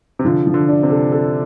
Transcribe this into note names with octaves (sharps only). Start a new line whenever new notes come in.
C3
D3 F3
F3
D3
D4
C3
A4
A4